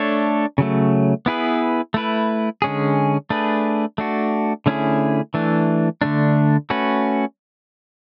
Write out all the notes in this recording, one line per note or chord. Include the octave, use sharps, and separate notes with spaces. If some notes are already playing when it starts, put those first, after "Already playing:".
Already playing: A3 D4 A4 C#5
C#3 F#3 A3
B3 E4 G#4 B4
A3 E4 B4
D3 G#3 C#4 G#4
A3 D4 G#4 B4
A3 D4 F#4
D3 A3 C#4 E4 G#4
E3 A3 D4
D3 A3 D4
A3 C#4 F#4 B4